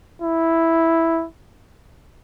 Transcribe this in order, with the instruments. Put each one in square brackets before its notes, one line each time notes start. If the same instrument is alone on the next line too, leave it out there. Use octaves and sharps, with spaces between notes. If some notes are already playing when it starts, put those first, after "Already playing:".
[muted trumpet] E4